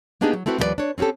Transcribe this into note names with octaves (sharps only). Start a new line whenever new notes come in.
A#3 B3 D4 D#4 G4 G#4
F#3
A3 C4 E4 F#4 B4
D#2 F3 G3 E4 B4 D5
D4 C#5
C4 C#4 F#4 G4 A4